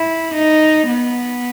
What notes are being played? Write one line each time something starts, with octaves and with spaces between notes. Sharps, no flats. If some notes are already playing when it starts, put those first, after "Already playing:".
Already playing: E4
D#4
B3